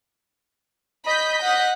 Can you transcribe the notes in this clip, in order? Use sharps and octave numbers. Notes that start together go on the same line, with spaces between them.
D#5 B5 G6 B6
F#5